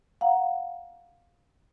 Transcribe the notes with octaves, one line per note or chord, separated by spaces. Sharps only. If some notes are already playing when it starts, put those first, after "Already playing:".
F5 F#5 A#5